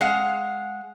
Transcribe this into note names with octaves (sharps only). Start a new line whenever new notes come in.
G#3 F5 F#5